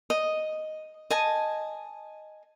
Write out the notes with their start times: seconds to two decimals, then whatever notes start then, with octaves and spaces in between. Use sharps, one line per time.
0.10 D#5
1.10 D#5 G#5 A5